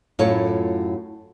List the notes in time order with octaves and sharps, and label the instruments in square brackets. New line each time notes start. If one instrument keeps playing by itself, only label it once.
[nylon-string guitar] F#2 A2 F4 A4 C#5